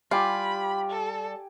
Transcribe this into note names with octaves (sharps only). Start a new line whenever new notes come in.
G3 F4 G4 G5 G#5 B5
A4